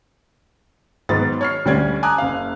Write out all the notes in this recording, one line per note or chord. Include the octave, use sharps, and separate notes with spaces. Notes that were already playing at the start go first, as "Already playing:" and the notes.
G#2 D#3 F#3 B3 A6
C#5 F6 C7
D2 G3 C#4 D5 G#6
G#5 A#5 D6 D#6 F#6
F#1 F5